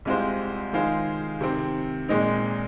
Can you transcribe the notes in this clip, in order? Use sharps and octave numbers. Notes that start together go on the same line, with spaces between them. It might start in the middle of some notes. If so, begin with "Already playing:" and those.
C2 C3 G#3 F4 C5
D#3 G#3 F4 G#4 C5
C3 D#3 C4
A#2 G#3 C4 D#4